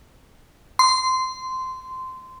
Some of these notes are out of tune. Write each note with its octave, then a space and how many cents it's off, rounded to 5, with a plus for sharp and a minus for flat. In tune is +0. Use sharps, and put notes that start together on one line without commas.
C6 -15